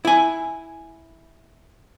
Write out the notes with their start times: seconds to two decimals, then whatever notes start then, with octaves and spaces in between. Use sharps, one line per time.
0.05 E4 G#5